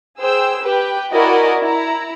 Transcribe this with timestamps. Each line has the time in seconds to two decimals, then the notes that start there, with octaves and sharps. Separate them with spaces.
0.20 G#4 C5 G5 E6
0.64 G4 B4 G5
1.12 E4 F#4 A#4 D5 D#5 G#5
1.63 E4 A#5